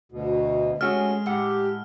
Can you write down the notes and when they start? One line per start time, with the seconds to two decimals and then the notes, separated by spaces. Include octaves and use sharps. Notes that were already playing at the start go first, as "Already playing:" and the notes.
0.12 D2 B2
0.81 G#3 A3 C#4 F#4 G#4 F6
1.26 A2 G4 F#5